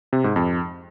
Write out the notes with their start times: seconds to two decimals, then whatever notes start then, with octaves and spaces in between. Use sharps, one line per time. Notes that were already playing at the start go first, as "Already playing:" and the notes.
0.13 C3
0.24 G#2
0.36 F2